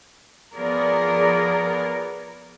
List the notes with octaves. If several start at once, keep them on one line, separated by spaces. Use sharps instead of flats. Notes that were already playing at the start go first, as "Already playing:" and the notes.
F3 B3 G#4 A#4 D5